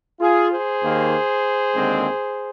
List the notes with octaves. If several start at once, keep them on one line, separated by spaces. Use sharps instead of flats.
F4 G#4
G#4 C5
D#2 D#3 A#3
D#2 D3 G#3 C4